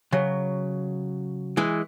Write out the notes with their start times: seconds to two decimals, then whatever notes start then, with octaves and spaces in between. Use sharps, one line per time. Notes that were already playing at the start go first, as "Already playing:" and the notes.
0.12 C#3 F#3
1.57 E3 G#3